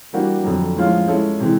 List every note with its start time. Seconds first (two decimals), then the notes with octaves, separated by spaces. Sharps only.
0.13 E3 G3 A#3 D4 F#4
0.44 F2 D3 F#3
0.77 A2 F3 G#3 C#4 F4
1.08 G#3 C#4 E4 A4
1.40 C3 E3 G#3